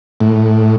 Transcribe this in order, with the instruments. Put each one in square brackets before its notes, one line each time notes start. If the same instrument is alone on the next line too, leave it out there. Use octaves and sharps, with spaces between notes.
[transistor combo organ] A2